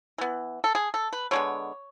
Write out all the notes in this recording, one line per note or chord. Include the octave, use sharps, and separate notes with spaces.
E3 B3
A4
G#4
A4
B4
D3 G#3 B3 C#5